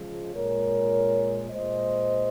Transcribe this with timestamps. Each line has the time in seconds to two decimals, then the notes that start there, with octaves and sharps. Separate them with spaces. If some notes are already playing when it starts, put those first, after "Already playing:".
Already playing: C#3 F3 G#3
0.34 A#2 G#3 A#4 C#5
1.50 A#2 G#3 C5 D#5